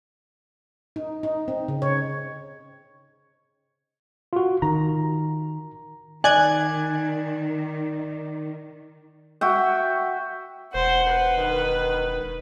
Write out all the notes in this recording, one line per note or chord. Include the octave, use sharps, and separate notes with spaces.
D#4
D#4
C4
C#3
C#5
F4 F#4
D#3 A#5
D#3 D5 G#5 F#6 G#6
F#4 E5 G5
E1 C5 F#5
B4
D#3